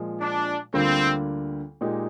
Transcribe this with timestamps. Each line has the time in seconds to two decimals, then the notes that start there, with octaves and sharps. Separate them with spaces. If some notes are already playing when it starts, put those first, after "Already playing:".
Already playing: A#2 F3 G#3
0.20 D4
0.73 D2 D3 G3 A#3 C4 F4
1.81 A#2 G#3 D#4 G4